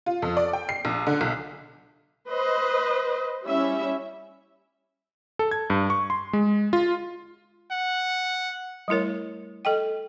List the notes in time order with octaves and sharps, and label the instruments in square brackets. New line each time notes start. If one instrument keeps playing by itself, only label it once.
[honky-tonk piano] F4
F2
D5
G5
C7
A#1
D3
B1
[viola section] B4 C5 D#5
G3 C#4 E4 E5
[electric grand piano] A4
G#6
G2
C#6
C6
G#3
F4
[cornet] F#5
[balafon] G3 A3 E4 A#4 C#5
A4 D#5 G5